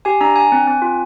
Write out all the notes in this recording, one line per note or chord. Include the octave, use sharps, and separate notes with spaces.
G4 G#5
D4 A#5
D4 G#5
C4
C4
F4